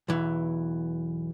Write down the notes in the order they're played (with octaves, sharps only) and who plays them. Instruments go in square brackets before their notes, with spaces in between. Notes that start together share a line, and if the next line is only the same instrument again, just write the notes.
[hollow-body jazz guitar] B1 E2 E3